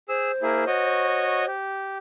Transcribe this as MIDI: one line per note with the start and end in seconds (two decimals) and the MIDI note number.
0.09 0.32 68
0.09 1.50 72
0.09 0.32 88
0.42 0.65 58
0.42 0.65 64
0.42 0.65 68
0.67 1.45 66
0.67 1.45 73
0.67 1.45 75
1.47 1.98 67